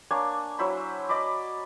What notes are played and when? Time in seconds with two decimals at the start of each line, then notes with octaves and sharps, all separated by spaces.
0.11 A#3 D4 C#5 G#5
0.59 F#3 E4 C5 B5
1.09 D5 D#5 B5 D6